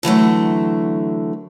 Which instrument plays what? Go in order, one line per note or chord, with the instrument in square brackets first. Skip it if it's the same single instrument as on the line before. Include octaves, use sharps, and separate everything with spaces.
[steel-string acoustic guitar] D3 E3 F#3 A3